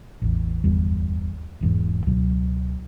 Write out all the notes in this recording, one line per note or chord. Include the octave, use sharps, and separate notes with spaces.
A1 E2
D1 G1 E2 G3
E1 E2 G#2
C#2 B2 F#3